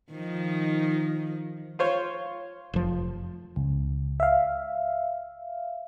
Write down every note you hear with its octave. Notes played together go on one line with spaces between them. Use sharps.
D#3 F3 D#4
F4 C5 C#5
F1 F3
C#2
E5 F5